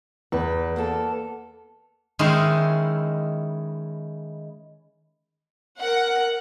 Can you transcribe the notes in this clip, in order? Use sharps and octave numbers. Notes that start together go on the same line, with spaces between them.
E2 B4
A#3 B3 A4
D#3 G#3 C#4 E4 C5
A#4 F#5